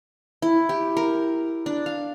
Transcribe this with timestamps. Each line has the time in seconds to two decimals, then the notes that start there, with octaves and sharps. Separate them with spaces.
0.42 E4
0.69 G4
0.97 A#4
1.66 D4
1.86 F5